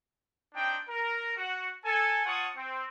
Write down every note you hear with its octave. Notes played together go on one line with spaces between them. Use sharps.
C4 D4 D#4 G5
A#4
F#4 F#5
A4 G#5
F4 C#5 F#5 A5 C#6 D#6
C4